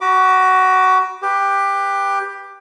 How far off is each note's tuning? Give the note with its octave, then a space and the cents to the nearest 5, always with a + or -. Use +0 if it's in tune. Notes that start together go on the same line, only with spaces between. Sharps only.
F#4 +15 B5 -35 D6 +0
G4 +15 B4 +0